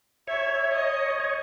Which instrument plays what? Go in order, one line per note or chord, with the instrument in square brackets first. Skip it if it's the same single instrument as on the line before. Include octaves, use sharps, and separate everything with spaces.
[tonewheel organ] C#5 [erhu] E5
[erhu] D#5
[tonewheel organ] C#5